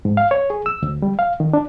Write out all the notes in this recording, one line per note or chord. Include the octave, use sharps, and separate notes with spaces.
G#2
F5
C#5
G#4
E6
D2
G3
F5
D#3
D4